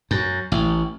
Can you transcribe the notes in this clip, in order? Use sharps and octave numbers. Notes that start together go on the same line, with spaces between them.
F#2
A1